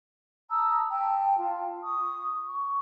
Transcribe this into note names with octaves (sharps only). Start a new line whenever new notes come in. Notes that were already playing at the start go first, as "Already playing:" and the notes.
A5 A#5 D#6 E6
G5 A5
F4 A5
C#6 D#6
C#6